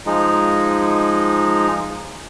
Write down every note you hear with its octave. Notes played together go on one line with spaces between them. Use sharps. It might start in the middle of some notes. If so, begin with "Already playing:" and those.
F3 G#3 D#4